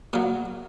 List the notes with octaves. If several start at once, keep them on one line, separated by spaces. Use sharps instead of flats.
A#2 F#3 F5